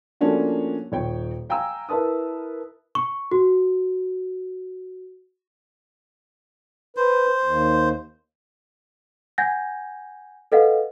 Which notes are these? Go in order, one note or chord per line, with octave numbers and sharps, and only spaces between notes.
F3 A3 A#3 C#4 D4 F#4
D#1 C#5 G5
F5 G5 G#5 A#5 E6
E4 A#4 B4 A5 D#6
C#6
F#4
B4 C5
D#2
F#5 G#5 G6 G#6 A#6
A4 B4 D#5 F5 F#5